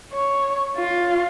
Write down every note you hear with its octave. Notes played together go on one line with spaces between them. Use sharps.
C#5
F4